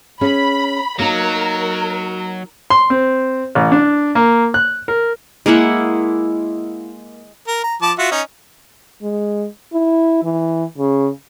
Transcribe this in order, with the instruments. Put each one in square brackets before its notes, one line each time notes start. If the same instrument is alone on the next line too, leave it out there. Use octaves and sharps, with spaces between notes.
[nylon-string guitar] C#4 G#4 [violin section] B5
[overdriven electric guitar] F#3 [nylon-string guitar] A#3 D#4 [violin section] A#4
[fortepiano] C6
C4
A1
D4
A#3
F#6
A#4
[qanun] G#3 A#3 E4 F#5
[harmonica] A#4
A#5
F3 A5 D6
F4 F#4 E5
C#4 D#4
[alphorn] G#3
E4
E3
C#3